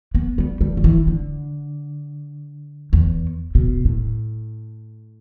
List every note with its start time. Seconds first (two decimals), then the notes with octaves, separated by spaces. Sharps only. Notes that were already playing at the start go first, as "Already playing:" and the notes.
0.15 B3
0.38 G3
0.61 G3
0.77 F#3
0.84 E3
1.07 D3
2.93 E2
3.55 B2
3.85 A2